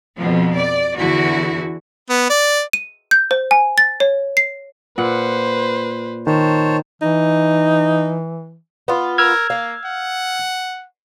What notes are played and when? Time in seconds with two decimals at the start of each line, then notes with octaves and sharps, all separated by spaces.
0.17 F2 B2 F3
0.57 D5
0.98 E2 D3 E4 F#4
2.10 B3
2.30 D5
2.73 D#7
3.11 G6
3.31 C5
3.51 G#5
3.78 A6
4.00 C#5
4.37 C7
4.98 A#2 B4 C5 F#5
6.27 D#3 C5 C#5 A5
7.02 E3 D#4
8.88 B3 F4
9.18 A#4 E6 F6 G#6
9.50 A#3 F5
9.85 F#5